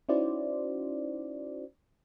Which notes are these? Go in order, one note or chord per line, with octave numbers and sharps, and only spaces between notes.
C#4 D#4 E4 F#4 C5 D5